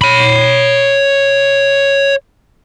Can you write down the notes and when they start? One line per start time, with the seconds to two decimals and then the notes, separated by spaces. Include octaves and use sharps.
0.01 C#5 B5